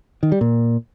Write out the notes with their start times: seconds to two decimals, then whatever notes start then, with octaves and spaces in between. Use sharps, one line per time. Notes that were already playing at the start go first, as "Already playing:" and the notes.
0.23 D#3
0.32 G3
0.41 A#2